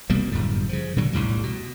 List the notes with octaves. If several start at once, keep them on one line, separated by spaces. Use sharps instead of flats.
C2 B2 G3 A#3
G1 F#2 A2 G3
C#3 F3
A#2 D3 F#3 G3
B1 F2 A2 G3
B2